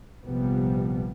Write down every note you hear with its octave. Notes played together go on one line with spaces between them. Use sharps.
A#1 C3 F3 G3 B3